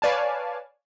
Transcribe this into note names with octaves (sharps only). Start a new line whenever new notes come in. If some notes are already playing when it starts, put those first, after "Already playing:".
B4 C#5 D5 F5 G#5 A5